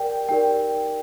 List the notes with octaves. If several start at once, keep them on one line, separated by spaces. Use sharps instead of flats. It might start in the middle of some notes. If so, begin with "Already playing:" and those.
Already playing: G4 A#4 D5 G5
D#4 G4 A#4 D5 G5